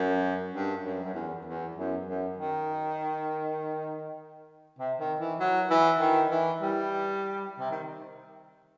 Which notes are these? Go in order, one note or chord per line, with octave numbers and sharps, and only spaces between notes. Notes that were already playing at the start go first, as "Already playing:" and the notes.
Already playing: F#2
G2
F#2
F#2
E2
E2
F#2
F#2
D#3
C3
D#3
E3
F#3
E3
D#3
E3
G3
C3
D#3